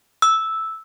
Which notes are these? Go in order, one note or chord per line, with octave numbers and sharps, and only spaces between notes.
E6